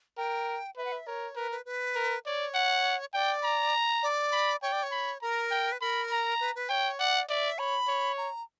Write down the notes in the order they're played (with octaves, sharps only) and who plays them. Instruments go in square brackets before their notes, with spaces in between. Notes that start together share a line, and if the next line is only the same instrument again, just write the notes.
[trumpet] A#4 [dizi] G5
[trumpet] B4 [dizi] E5
[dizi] F#5
E5
[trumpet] A#4 [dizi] C#5
[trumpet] A#4 [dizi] B4
[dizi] B4
B4
[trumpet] A#4
[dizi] C#5 [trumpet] D5
[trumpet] F#5
[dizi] D5 [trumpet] G5
[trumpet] A#5
[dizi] D5
[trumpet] B5
[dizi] C#5 [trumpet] G5
[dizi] D5
C#5
[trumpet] B5
[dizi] A#4 [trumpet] A#5
[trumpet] G5
[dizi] B4
[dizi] A#4 [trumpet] B5
[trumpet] A#5
[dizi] B4
B4
[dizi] C#5 [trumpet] G5
[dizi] D5 [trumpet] F#5
[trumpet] D5 [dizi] E5
[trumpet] C#5 [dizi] B5
[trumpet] C#5
[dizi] A#5